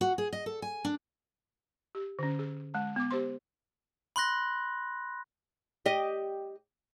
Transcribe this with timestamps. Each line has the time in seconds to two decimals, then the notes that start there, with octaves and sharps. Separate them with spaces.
0.01 F#4
0.18 G#4
0.33 D#5
0.46 A4
0.62 G#5
0.85 D4
1.95 G4
2.19 D3 C#4
2.39 G#4
2.74 G#3 A5
2.96 B3 D6
3.11 G4 C5 C6
4.16 B5 C6 F#6 A#6
5.86 G4 D#5